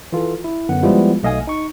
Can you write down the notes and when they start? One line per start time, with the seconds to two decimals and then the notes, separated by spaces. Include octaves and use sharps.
0.12 E3 F4 A4
0.44 E4
0.69 F#2 D3 B3 F#5
0.83 F3 G3 G#3 B3 E4 F4
1.23 B1 A3 D#5 F5 G#5 D#6
1.47 D#4 C#6